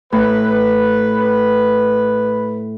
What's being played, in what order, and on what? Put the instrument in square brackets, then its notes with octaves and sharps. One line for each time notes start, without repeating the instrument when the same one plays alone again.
[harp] A2 [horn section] B4